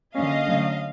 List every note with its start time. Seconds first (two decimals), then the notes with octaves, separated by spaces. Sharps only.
0.15 D3 F#3 A#3 C#4 D#5 F5
0.45 D3 F#3 A3 C#4